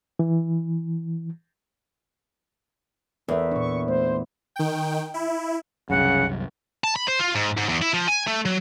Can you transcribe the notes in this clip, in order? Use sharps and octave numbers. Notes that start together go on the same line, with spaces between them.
E3
E2 A4 A#4 E5
A#2 D4 C#6
A3 C5
D#3 G5
E4
C2 F#2 C#3 F#5
A5
B5
C5
F4
G#2
G#2
E2
E4
F3
G#5
A3
F#3